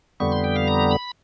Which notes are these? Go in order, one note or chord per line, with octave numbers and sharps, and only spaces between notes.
F2 D3 G3 B3 C#6
C6
G5
F5
A#5
B5